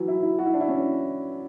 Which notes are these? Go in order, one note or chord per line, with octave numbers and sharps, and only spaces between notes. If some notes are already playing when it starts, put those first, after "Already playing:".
Already playing: E3 F#3
E4
E4
F#4
E4
D4
E4
C#4